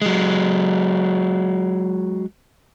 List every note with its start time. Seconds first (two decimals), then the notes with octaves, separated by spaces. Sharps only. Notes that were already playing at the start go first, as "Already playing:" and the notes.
0.02 F#3 G#3